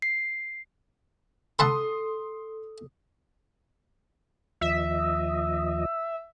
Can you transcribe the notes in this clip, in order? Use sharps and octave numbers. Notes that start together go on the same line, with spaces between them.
C7
A4 F#5 A5 B5 C6 D#6
D#2 F3 D#5 E5